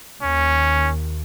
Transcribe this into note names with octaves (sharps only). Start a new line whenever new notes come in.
D#2 C#4